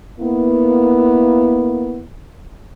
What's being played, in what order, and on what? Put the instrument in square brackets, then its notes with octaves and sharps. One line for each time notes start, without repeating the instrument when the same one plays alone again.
[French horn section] A#3 B3 E4